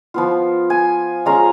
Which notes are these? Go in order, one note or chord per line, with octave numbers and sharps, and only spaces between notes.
F3 B3 F4
G#5
G#3 C#4 F4 A#5